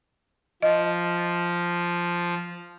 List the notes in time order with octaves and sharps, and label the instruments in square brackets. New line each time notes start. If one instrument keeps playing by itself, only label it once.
[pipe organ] F3 [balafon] D#5